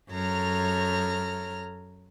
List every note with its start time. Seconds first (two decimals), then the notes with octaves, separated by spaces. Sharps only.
0.12 F#2 A4 C#5 A#5 F6